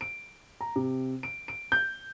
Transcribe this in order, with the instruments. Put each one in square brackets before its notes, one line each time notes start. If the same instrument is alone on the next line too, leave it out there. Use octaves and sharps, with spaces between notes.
[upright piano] D7
A#5
C3
D7
D7
G6